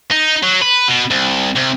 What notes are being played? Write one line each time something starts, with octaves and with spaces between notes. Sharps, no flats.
D#4
F#3
B4
B2
C2
C2